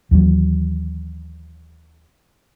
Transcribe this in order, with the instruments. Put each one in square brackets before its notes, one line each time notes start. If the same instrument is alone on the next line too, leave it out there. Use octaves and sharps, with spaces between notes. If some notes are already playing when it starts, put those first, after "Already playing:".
[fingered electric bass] D#2 E3 F#3